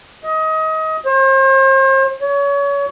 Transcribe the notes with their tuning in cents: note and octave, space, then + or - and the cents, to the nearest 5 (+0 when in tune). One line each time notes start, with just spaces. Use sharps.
D#5 +25
C5 +40
C#5 +30